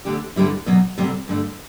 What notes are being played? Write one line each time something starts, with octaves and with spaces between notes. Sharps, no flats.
E2 D3 A3 D4 G4
G2 D3 G3 C4 E4
E2 B2 F#3
D2 C3 G3 C4
G2 D3 A3 D4